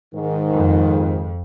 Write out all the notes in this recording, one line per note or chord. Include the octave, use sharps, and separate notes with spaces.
G#2 D#3
F2